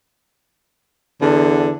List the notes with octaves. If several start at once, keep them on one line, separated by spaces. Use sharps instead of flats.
E2 D3